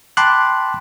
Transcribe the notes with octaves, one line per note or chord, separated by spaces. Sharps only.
G5 A5 B5 C6 D6 F#6